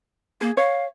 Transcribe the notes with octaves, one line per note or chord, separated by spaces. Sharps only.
A#3 G#4
C#5 F5